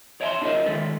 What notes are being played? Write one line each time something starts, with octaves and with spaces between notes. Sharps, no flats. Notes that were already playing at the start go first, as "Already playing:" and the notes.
C#5 D5 E5 G#5 A5 C6
D4 F4 G#4 A#4 D#5 E5
D3 D#3 G#3 A4 B4